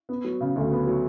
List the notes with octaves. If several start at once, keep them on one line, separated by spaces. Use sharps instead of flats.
B3
F#3
C#3
D2
B3
F#3